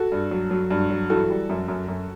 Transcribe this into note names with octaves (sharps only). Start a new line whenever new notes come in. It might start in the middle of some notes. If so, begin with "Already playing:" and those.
Already playing: F#4 A4
G2
F#3
F#3
G2
F#3
E3 F#4 A4
G3
F#2
F#2
F#2